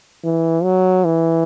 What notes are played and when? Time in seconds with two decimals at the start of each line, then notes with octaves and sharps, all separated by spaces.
0.24 E3
0.63 F#3
1.05 E3